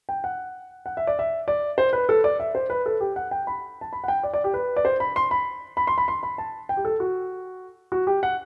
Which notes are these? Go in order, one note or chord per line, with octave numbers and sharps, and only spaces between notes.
G5
F#5
F#5
E5
D5
E5
D5
C5
B4
A4
D5
E5
C5
B4
A4
G4
F#5
G5
B5
A5
B5
F#5
G5
D5
D5
G4
B4
D5
C5
B5
C6
B5
B5
C6
B5
C6
B5
A5
G5
G4
A4
F#4
F#4
G4
F#5